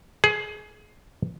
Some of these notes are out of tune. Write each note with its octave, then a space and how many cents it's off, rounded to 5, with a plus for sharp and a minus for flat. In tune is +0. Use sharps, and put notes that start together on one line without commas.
G#4 +25